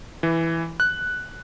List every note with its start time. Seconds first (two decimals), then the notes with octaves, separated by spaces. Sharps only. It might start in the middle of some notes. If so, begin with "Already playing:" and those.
0.23 E3
0.80 F#6